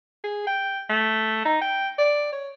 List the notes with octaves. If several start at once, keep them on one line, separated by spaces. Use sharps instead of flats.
G#4
G5
A3
D#4
G5
D5
C#5